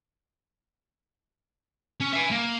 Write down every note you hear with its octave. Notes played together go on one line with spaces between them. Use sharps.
C#4
E5 G#5
A#3